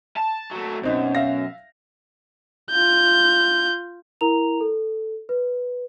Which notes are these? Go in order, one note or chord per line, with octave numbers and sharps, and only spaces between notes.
A5
F#3 A3
F#2 B2 C4 C#4 D#4
E5 F5 A#6
F4 G6
E4 A#4 A#5 F7
A4
B4